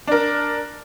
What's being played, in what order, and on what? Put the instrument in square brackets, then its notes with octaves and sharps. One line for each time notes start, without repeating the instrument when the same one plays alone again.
[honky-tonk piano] D4 A#4